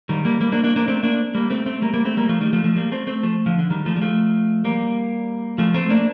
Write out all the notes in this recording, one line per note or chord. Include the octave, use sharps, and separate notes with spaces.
D#3 G3
G3 A#3
G3 A#3
A#3 D4
A#3 D4
A#3 D4
A3 C4
A#3 D4
G3 A#3
A3 C4
A3 C4
G3 A#3
G3 A#3
A3 C4
G3 A#3
F3 A3
D#3 G3
F3 A3
F3 A3
G3 A#3
A3 C4
A3 C4
F3 A3
D3 F3
D3
D#3 G3
F3 A3
G3
F3 A3
G3 A#3
F3 A3
A3 C4
A#3 D4